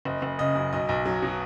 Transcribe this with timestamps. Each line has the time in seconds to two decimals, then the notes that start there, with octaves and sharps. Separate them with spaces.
0.05 F#1 D#5
0.22 F#1
0.39 C#3 D#5
0.56 F#2
0.73 B1 D#5
0.89 B1
1.05 F#3
1.22 B2